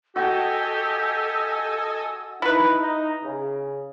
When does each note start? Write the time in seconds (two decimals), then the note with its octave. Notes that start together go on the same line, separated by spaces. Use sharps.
0.16 F#4 G4 A4 D#5 G5 G#5 E6
2.42 D#4 E4 B4
2.79 D#4
3.24 C#3